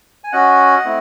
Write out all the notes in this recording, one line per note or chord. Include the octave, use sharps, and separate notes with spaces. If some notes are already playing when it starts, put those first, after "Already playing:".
G#5
C#4 F#4 D#5 F#5
A3 C4 E4